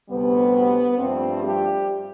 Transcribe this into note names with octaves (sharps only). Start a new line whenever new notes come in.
D2 C3 G3 B3
G2 F3 A3 C4
G3 G4